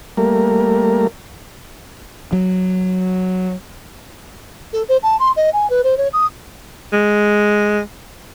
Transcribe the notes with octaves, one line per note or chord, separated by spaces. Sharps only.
G3 A3 A#3 A#4
F#3
A4
C5
A5
C6
D#5
G#5
B4
C5
C#5
D#6
G#3